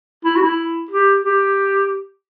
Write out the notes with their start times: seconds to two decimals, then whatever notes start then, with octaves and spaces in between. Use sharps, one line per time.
0.25 E4
0.36 F#4
0.41 E4
0.91 G4
1.24 G4